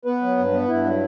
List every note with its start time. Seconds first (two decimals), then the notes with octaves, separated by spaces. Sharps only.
0.05 B3 B4
0.22 F#3
0.38 G2
0.53 B3
0.68 G2 E4
0.84 F#3